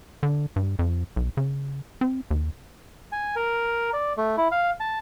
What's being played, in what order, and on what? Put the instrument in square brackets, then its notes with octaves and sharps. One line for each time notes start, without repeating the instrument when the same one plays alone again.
[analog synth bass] D3
G2
F2
B1
C#3
C4
D#2
[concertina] G#5
A#4
D5
A3
E4
F5
A5